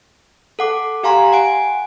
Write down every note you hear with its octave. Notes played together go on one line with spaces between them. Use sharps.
A4 F#5 D6
G4 F5 G#5 A#5 C6
F#5 G#5 D7